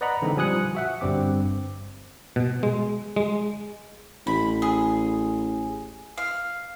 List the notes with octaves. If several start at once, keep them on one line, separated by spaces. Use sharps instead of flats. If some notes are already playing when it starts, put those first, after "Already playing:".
B4 D5 D#5 F#5 A#5 B5
D3 E3 G#3 C4 D#4
F3 G3 G#5 D#6 F#6 C#7
F#4 E5 F#5
G1 G2 G3 C4 D6
B2
G#3
G#3
A1 B5
G#4
F5